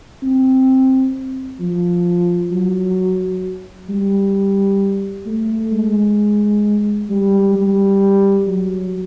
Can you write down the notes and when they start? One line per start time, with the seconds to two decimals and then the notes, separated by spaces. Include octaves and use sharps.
0.23 C4
1.59 F3
2.51 F#3
3.89 G3
5.26 A3
5.72 G#3
7.10 G3
7.55 G3
8.47 F#3